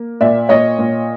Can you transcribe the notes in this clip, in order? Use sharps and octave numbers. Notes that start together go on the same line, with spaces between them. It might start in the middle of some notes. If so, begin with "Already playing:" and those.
Already playing: A#3
A#2 D5 E5
A#2 C#5 D#5
A#2